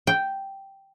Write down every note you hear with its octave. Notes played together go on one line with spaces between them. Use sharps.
G5